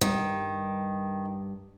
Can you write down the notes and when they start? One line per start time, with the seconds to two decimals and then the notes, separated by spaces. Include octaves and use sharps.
0.01 G2 D#3 G3